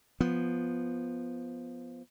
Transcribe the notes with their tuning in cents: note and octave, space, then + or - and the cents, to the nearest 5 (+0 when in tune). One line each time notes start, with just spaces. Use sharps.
F3 +0 B3 +0